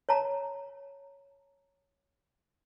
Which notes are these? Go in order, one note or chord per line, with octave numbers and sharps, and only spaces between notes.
C#5 A5 A#5